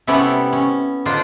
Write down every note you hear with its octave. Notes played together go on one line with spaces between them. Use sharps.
C3 G3 B3 C#4 E4 A4
C#4
D3 F3 D4 D#4 F4 C5